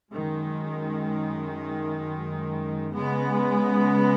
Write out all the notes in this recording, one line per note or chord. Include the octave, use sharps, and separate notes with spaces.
F#2 D#3 G#3
C#3 G#3 B3